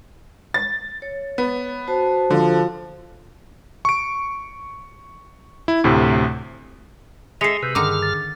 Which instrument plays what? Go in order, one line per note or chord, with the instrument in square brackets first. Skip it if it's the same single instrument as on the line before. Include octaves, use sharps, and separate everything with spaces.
[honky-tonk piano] A6
[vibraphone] C#5
[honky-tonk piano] B3
[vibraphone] F#4 C5 A5
[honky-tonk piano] D3 [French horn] F3
[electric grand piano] C#6 D7
E4
D2 A2 C3
[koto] G#3 A4 [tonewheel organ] D#5 E5 [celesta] C7 C#7 F7
[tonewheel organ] C3 B4 [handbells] E6 G6
[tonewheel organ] G2 F6 [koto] D3 D#3 A#5 [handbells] G#4 [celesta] D6
[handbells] A6